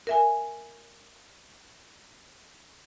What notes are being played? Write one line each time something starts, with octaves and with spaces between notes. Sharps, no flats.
A#4 E5 G#5